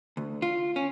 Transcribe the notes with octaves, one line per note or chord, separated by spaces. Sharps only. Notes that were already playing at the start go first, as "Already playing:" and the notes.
D2
F4
C#4